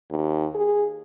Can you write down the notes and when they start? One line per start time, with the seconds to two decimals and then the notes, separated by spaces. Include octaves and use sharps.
0.11 D#2
0.55 G#4